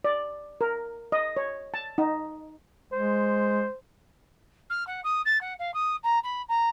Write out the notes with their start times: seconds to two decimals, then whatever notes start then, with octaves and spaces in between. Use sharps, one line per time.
0.04 D5
0.61 A#4
1.12 D#5
1.37 C#5
1.74 A5
1.98 D#4
2.93 G#3 C5
4.70 F6
4.87 F#5
5.04 D#6
5.25 A6
5.41 F#5
5.59 F5
5.74 D#6
6.03 A#5
6.23 B5
6.48 A#5